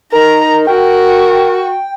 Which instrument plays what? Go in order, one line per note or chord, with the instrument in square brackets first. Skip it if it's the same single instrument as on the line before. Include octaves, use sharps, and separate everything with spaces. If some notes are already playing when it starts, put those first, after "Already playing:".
[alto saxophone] D#4 [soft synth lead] A#4 [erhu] A#5
[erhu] F#4 [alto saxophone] A#4 [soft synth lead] G5